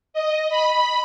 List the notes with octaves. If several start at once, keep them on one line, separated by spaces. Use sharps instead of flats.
D#5
B5